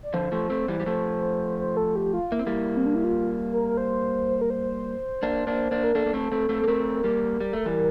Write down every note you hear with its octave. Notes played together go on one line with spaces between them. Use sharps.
D5
D3 F3 C5
F3 A3
A3 C4
E3 G3
G3
F3 A3
C5
A4
G4
F4
A#3 E4
C4
G3 A#3
C4
D4
E4
F4
A#4
A#4
C5
A#4
C5
A#3 D4
A#3 D4
A#3 D4
A#4
A#3 D4 A4
A#3
A3 C4
A3 C4
A3 C4
A#3
A3 C4 A#4
G3 A#3
G3
A3
E3 G3